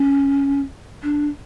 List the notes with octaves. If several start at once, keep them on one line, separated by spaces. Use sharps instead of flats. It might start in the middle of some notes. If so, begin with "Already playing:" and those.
Already playing: C#4
D4